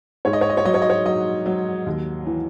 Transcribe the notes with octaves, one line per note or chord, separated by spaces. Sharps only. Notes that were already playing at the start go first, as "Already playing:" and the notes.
G#2 C#5
D#5
C#5
D#5
C#5
F#3 D#5
C#5
D#5
C#5
F#3 D#5
F#3
D#2
E3